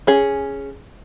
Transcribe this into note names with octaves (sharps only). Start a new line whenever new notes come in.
C#4 G#4